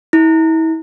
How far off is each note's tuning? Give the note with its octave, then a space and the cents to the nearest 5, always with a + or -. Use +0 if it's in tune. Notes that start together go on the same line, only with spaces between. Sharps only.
E4 -35